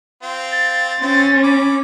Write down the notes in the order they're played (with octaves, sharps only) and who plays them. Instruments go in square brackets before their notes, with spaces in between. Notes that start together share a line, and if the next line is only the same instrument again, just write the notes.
[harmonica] C4 F4
[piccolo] A6
[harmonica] C4 F4 C5 [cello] C#4
[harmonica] B5 D6